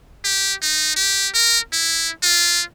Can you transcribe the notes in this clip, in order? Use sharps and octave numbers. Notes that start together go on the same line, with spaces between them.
G4
D#4
G4
A#4
E4
F4